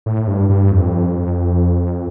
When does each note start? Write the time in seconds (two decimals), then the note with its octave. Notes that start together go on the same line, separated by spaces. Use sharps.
0.06 A2
0.27 G2
0.50 G2
0.71 F2